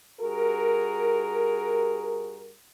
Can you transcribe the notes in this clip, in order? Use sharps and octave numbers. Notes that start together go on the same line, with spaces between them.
G2 F#4 G#4 A#4